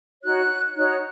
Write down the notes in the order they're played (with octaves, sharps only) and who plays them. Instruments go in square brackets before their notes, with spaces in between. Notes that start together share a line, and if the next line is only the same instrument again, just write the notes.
[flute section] D#4 F#4 C#5 F#6
D#4 F#4 C#5 F#6